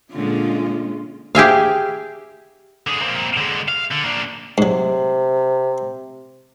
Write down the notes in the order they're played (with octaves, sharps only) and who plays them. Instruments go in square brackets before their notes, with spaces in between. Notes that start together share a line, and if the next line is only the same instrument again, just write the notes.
[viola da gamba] A#2 D3 [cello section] G#3 C#4 F4
[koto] G4 G#4 E5 F5
[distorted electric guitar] D3 G#4
A#3 C4
D3 G#3
F5
D3
A#3 D4
[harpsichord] G#2 F#3 [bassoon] C3